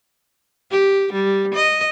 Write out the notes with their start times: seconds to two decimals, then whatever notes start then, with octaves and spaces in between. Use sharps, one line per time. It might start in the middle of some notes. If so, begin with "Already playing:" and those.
0.71 G4
1.13 G3
1.54 D#5